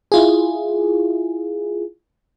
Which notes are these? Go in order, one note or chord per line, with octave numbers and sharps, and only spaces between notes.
E4 F4 G#4